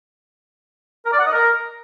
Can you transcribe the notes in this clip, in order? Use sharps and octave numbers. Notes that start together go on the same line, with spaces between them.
A#4
D5
F#5
D#5
A#4